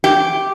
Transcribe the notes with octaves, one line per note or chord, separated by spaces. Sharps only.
G4